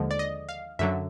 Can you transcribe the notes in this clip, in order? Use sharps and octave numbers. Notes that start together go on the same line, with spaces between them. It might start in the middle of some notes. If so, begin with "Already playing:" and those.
Already playing: D#2 D3 F3 G#3
D5
D#5
F5
F#2 D3 F#3 E5